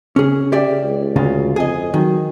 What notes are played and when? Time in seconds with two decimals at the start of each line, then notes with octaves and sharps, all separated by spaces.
0.16 C#3 C#4 G#4
0.52 G4 D5 E5
0.83 C#2
1.16 D2 C#3 F4
1.56 F2 G#4 D#5
1.94 D#3 F#3